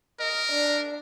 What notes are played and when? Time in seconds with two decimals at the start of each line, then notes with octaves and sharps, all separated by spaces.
0.20 A#4 D#5
0.52 D4